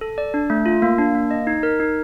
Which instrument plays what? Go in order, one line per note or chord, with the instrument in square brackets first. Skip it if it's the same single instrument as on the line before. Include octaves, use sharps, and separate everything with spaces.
[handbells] A4
D5
D4
A3
F4
A#3
D4
A#3
D#5
D#4
A#4
D#4